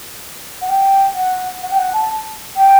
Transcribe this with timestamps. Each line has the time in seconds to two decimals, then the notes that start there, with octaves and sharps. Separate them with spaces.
0.61 F#5
0.69 G5
1.15 F#5
1.62 F#5
1.71 G5
1.79 F#5
1.93 A5
2.56 G5